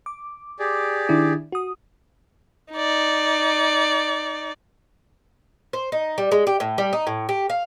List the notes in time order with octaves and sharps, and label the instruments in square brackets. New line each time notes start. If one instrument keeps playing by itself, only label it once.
[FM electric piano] D6
[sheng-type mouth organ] G4 G#4 D5
[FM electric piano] D#3 D4 E4
F#4 D#6
[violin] D#4 D5
[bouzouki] C5
D#4
G3
G#3
G4
A2
G3
D#4
A2
G4
F5